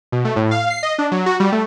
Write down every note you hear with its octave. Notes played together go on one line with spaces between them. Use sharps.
B2
A3
A2
F5
C7
D#5
D4
F#3
F#4
G3
A3